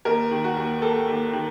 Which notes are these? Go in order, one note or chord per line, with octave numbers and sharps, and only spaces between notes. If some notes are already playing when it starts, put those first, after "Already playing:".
D#2 A#4
D#3
F#4
D#2
A#3 A4
D#2
D#3